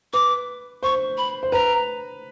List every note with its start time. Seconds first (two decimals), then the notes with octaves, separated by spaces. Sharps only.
0.13 B4 D6
0.83 C5 C#6
1.18 B5
1.43 C5
1.52 B4 A#5